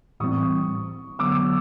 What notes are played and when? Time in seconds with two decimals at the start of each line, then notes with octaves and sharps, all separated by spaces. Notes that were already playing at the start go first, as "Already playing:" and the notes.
0.20 A2 E3 G3 C4 C#6 D#6
1.19 D3 F#3 B3 D6 E6